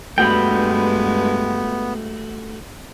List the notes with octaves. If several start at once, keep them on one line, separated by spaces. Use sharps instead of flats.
G2 G#3 A3 B3 F#4 G5 B5